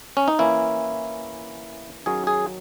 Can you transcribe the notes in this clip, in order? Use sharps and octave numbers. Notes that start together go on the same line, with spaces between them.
C#4
D#4
E3 A#3 C#4 E4
D#3 F#3 C#4 G#4
G#4